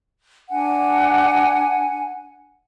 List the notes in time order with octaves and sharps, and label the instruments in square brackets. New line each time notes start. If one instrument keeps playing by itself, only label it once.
[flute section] D4 F#5 G#5